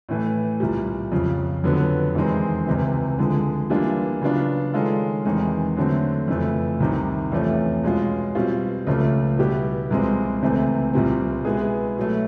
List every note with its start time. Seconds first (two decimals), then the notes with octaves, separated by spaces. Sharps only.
0.09 A2 E3 A3
0.60 C2 A#2 G3
1.12 F2 C#3 F3
1.64 F2 D3 F#3 B3
2.15 E2 C3 D#3 G#3 C4
2.67 C#2 C3 E3
3.18 D3 F3 G#3
3.70 E3 G3 A#3 D4 F4
4.21 C#3 F#3 B3 D4 F4
4.74 D#3 G#3 C#4 F4 A4
5.25 E2 C3 D#3 G#3
5.77 D3 F#3 A3 C4
6.28 F2 C#3 E3 A3
6.80 C2 C3 D#3
7.32 E2 C3 F3 A3 C#4
7.83 B2 G#3 C#4 F4
8.35 B2 G3 C4 F4
8.87 C#2 C#3 F3 A3 C#4
9.38 B2 G3 B3 E4 G4
9.90 C2 A#2 F3 G#3 C4
10.42 C#2 C3 E3 A3 C4
10.93 C2 A#2 G3 C4
11.45 B2 G#3 B3 E4 G#4
11.97 B2 F#3 A3